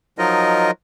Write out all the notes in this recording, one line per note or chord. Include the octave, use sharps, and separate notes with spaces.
F3 F#3 D#4 F4 A#4 D#5